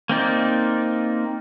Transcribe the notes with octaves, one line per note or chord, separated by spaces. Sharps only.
A#3 C4 D#4 D5